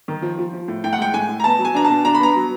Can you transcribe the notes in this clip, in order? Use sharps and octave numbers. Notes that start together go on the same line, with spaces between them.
D#3
F3
F3
F3
A2
A2 G5
F#5
G#3 G5
A2 G#5
A2
A#5
B3 A5
F#3
G#5
D4 A#5
B2 A5
D4 A#5
B5
B3 A#5
F#3